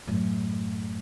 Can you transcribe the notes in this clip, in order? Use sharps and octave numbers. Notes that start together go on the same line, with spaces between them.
F#2 A2